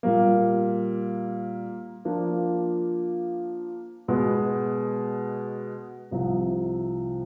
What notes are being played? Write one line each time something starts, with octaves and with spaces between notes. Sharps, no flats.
A#2 G3 A#3
F3 A#3 D4 F4
B2 G#3 B3
C2 C3 F3